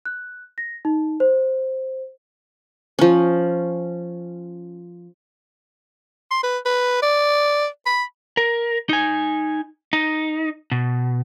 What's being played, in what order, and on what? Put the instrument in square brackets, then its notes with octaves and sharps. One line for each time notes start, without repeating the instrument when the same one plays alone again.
[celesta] F#6
A#6
D#4
C5
[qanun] F3 C#4
[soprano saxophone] C6
B4
B4
D5
B5
[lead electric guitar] A#4
D#4 G#5
D#4
B2